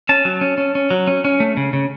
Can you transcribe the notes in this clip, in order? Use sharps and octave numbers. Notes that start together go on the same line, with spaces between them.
C#4 A5
F#3
C#4
C#4
C#4
F#3
C#4
C#4
A3
C#3
C#3